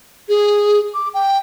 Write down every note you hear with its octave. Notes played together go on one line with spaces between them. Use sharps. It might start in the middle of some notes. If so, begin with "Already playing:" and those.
G#4
D6
G5